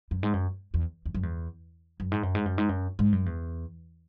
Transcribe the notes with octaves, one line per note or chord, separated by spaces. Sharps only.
F#2
G#2
F#2
E2
E2
F#2
E2
F#2
G#2
F#2
G#2
F#2
G#2
F#2
G#2
F#2
E2